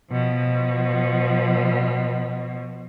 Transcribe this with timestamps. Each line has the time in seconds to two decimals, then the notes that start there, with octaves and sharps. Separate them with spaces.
0.12 B2 F3